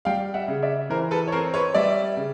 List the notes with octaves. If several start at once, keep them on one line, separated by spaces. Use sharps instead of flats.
G3 F5 G5
E5 F#5
C#3
D5 E5
E3 A#4 C5
A4 B4
C#5
C4 A#4 C5
B4 C#5
G3 D5 E5
C#3